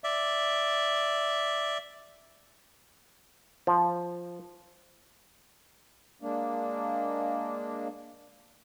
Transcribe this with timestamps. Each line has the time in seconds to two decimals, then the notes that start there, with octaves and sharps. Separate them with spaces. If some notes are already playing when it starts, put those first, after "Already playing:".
0.04 D5 E5
3.67 F3
6.22 G#3 A#3 D4